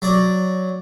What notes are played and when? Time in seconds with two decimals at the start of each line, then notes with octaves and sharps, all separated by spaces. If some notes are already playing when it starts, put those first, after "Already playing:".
0.02 F#3 D5